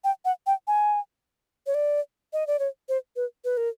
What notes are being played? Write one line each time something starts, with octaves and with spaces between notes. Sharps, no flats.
G5
F#5
G5
G#5
C#5
D5
D#5
D5
C#5
C5
B4
B4
A#4